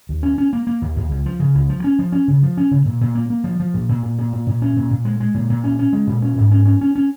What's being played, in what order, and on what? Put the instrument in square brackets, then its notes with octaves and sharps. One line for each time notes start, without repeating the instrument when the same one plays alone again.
[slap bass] D#2
C#4
C#4
A#3
A#3
D#2
D#2
C#2
F3
C#3
C#2
F3
C#4
F3
C#4
C#3
F3
C#4
C#3
A#2
A#2
A#3
A#3
F3
F3
A#2
A#2
A#2
A#2
A#2
A#2
C#4
A#2
A#2
G#3
G#3
A#2
A#2
C#4
C#4
G#3
A#2
C#4
G#2
C#4
C#4
C#4
C#4